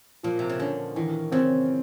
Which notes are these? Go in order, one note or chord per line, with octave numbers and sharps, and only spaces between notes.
A#2 F3
C3
C#3
D3 C#4
D#3 E3
C#3 C4